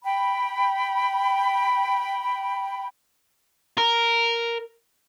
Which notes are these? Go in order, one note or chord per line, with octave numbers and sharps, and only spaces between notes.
G5 B5
A#4